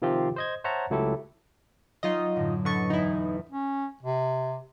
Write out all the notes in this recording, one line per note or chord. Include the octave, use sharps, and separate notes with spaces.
C3 D#3 F3 C4 F4 G4
C5 D#5 G#6
C5 C#5 E5 F#5 A5 A#5
C#2 F#3 A3 E4 G4 A4
F#3 D#4 F4 D#5 D#7
F#2 A2 D3
D3 B4 D#5 C#6 A6
A1 E2 D#4 E4
C#4
C3